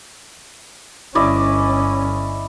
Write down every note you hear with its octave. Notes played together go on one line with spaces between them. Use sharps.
G1 C#4 E4 D5 D#5